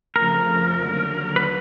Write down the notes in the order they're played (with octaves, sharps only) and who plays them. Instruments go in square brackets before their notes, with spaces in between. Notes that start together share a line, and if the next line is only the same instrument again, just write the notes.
[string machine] F2 C#3 F3 A3 [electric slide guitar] A#4
[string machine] D#2 D3 F#3
[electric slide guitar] B4